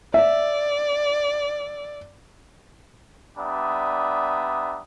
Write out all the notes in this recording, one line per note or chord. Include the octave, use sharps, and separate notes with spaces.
D5 E5
G3 B3 D4 E5 A#5 D#6